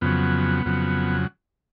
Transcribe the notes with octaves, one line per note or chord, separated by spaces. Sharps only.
F2 C#3 F#3 B3
F2 C#3 F#3